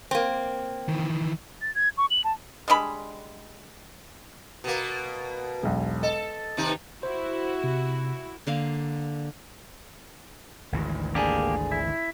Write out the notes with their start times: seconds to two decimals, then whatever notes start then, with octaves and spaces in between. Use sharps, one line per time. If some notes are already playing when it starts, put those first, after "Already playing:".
0.11 A#3 C4
0.89 D#3 E3
1.62 A6
1.75 G#6
1.98 C#6
2.11 F#7
2.24 A5
2.68 D3 G3 G#3 B5
4.64 B2 A#3
5.63 E1 B1
6.03 A4 D#5
6.57 D#2 C3 D#4
7.03 E4 F#4 C5
7.64 C3
8.47 D3 A#3 F5
10.72 G#1 D2 E3
11.15 D3 A#3 D4 G4 G#4
11.72 E4